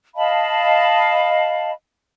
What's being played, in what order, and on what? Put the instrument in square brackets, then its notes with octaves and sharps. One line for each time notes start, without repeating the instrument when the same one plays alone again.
[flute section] D#5 F5 A5 B5